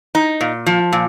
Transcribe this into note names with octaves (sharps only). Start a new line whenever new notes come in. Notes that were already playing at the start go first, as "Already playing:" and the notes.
D#4
A#2
F3
A#2